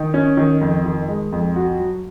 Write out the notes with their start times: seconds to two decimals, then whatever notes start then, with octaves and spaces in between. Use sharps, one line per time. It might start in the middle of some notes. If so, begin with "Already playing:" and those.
Already playing: D#3
0.14 C#4
0.37 D#3
0.61 F2
0.85 D#3
1.08 G#3
1.32 F2
1.56 F#4
1.80 F#3